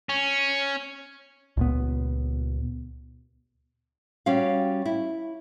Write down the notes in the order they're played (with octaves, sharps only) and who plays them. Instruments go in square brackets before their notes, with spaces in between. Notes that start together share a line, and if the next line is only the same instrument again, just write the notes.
[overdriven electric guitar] C#4
[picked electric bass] C#2 A#2 B3
[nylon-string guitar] G3 C#4 F#4 F5
E4